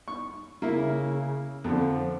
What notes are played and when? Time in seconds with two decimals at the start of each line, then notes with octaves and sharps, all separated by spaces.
0.08 C#6
0.62 C#3 A#3 E4
1.64 F2 D3 F3